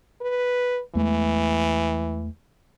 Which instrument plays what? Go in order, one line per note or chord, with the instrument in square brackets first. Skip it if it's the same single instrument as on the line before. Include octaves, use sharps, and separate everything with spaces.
[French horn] B4
[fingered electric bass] E2 G#3 A3 [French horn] E3